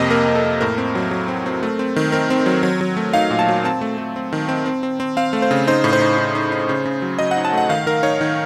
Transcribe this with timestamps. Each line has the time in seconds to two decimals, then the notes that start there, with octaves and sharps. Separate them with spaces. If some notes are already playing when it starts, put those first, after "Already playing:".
Already playing: F2 C3 A#3 D#5
0.10 A#3 A#4
0.28 F2
0.35 A4
0.45 A#3
0.61 A2 A#4
0.78 C4
0.95 F#3
1.11 F#3
1.28 C4
1.46 C4
1.63 A3
1.79 C4
1.96 D#3
2.12 C4 A#4
2.30 C4
2.46 F#3
2.63 F#3
2.81 F#3
2.97 A3
3.14 D#4 F5
3.30 A#2
3.39 A5
3.48 F#3
3.64 C4 A5
3.81 A3
3.98 A3
4.16 C4
4.33 D#3
4.49 C4
4.66 C4
4.83 C4
5.00 C4
5.17 C4 F5
5.33 A3
5.42 C5
5.51 C#3
5.67 D#4 C5
5.84 A2
5.93 C5
6.01 D#4
6.18 D#4
6.35 D#4
6.52 D#4
6.69 C#3
6.85 C#3
7.02 F#3
7.19 F#3 D#5
7.31 F#5
7.37 D#4
7.45 A5
7.53 A3 F#5
7.69 D#3 F5
7.86 D#3 A#4
8.03 D#4 C#5
8.21 D#3